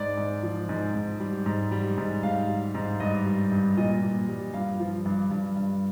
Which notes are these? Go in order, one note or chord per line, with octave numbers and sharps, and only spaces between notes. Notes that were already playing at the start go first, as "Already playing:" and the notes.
Already playing: G#2 D5
G#2
F3
G#2
G#2
G3
G#2
G3
G#2
G#2 F5
G3
G#2
G2 D#5
G3
G2
A#2 D#5
A#2
G3
G2 F5
F3
G2
G2
G2